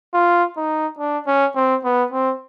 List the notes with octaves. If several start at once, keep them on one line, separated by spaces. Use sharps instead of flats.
F4
D#4
D4
C#4
C4
B3
C4